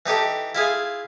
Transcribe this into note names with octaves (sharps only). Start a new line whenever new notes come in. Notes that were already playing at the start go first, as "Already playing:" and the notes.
E3 D#4 G4 A4
E4 F4 G#4